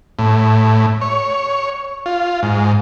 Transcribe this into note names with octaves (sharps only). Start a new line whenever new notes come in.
A2
C#5
F4
G#2